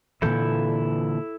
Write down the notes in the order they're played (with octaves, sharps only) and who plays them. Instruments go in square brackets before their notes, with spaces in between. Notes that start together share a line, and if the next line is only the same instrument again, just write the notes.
[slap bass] A#2 D3 E3 [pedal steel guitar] E4 A4 G6